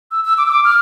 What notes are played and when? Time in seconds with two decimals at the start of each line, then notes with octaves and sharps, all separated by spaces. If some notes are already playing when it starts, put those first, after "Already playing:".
0.11 E6
0.25 E6
0.38 D6
0.46 E6
0.51 D6
0.64 F6